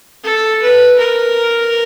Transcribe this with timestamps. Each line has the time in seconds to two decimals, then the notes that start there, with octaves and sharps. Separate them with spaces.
0.24 A4
0.62 B4
0.99 A#4